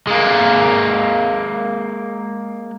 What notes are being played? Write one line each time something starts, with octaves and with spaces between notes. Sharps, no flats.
G#3 A#3